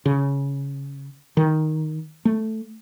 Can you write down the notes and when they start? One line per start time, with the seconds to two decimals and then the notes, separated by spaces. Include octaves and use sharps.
0.06 C#3
1.37 D#3
2.25 A3